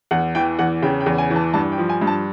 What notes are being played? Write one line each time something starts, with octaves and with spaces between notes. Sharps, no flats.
E2 F#5
E3 G5
E2 F#5
C#3 G5
G5
E2
G#5
E3
A5
G2 A5
G5
F3
G#5
G2
A5